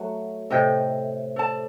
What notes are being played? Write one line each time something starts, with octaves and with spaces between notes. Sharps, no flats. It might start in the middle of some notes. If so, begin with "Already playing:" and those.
Already playing: F#3 A3 F#4
A2 C3 A4 D#5 G5
A4 D5 A5